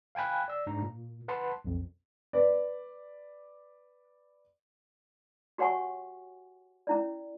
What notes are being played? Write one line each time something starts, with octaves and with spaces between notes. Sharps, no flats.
F5 G5 G#5 B5 F#6
D5 E6
G#2 D4 A#5
A#2
B4 F#5 A5 B5 C6
B1 F2
B4 D5
F#4 G4 C#5 F#5 G#5 C#6
C#4 E4 D5